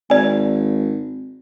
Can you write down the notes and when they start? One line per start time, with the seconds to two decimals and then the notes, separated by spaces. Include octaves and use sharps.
0.10 G#1 D5 G#5